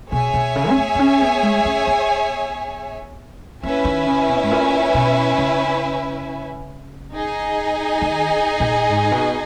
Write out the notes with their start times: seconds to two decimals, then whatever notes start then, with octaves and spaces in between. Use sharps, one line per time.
0.12 B2 G#4 C#5 E5 G#5
0.34 B2
0.55 C#3
0.70 C#4
0.77 B3
0.95 B3
0.99 C#4
1.22 B3
1.43 G#3
1.65 C#4
1.87 B3
3.63 A#3 C#4 E4 B4 E5 G#5
3.85 D#3
4.07 C#3
4.29 B2
4.44 G#2
4.51 A#2
4.94 B2
5.38 C#3
7.14 D#4 G#4 D#5 G#5
8.02 D#3
8.60 A#2
8.90 G#2
9.12 B2